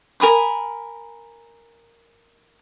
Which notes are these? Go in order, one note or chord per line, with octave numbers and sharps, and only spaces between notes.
A#4 G#5 B5 D#6